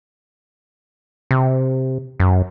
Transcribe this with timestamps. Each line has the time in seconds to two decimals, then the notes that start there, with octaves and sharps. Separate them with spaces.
1.31 C3
2.20 F#2